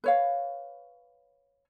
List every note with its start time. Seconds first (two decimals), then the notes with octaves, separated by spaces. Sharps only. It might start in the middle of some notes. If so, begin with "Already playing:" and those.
0.04 B4 C#5 F5